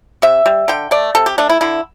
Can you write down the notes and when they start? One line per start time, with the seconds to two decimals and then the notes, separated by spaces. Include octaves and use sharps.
0.22 C3 E5
0.46 G3
0.68 D3 G5
0.91 A3 D5
1.15 C3 A4
1.26 G4
1.38 A3 D4
1.49 E4
1.61 D3 E4